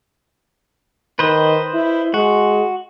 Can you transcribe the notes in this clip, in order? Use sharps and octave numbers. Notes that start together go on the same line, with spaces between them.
D#3 B4 C5 D#5
E4
G#3 F#4